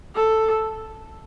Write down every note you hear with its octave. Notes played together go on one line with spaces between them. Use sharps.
A4